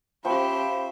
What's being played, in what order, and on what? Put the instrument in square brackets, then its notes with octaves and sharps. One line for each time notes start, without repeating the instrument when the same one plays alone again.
[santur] F3 G5 C#6 [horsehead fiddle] C#4 G4 [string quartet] C5 E5 [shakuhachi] B5